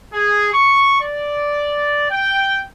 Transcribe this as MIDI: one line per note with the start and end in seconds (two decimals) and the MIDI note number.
0.13 0.49 68
0.53 1.00 85
1.01 2.07 74
2.11 2.60 79